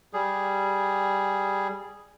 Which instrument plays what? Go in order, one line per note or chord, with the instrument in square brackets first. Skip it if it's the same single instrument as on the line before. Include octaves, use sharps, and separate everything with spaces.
[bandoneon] G3 G#4